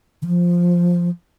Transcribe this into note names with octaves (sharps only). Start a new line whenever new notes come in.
D3
F3